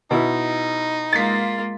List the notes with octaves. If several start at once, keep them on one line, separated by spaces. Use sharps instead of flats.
B2 D#4 E4
G#3 A#3 F4 A6 B6